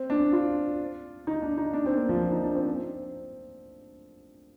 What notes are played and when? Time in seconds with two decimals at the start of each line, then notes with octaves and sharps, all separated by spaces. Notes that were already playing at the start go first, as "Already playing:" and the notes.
Already playing: C4
0.10 D4
0.32 F4
1.27 D#4
1.42 D4
1.58 D#4
1.73 D4
1.86 C4
1.96 A#3
2.09 F3
2.32 D#4
2.44 D4
2.55 C4
2.67 C4